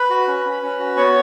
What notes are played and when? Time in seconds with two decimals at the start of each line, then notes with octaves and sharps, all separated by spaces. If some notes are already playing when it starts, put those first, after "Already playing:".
Already playing: B4 B5
0.10 F#4
0.28 C#4
0.45 C#4
0.63 C#4
0.79 F#4
0.97 B3 C#5 C#6